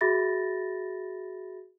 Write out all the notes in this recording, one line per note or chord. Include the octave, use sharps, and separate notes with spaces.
F#4 G#4 E5 B5 A6 A#6